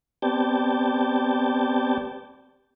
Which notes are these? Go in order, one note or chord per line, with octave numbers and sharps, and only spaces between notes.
B3 C4 G4 D5 G5 A5